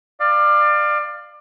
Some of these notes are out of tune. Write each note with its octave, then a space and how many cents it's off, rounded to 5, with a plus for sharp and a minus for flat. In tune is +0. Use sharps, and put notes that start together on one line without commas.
D5 +25 F5 +0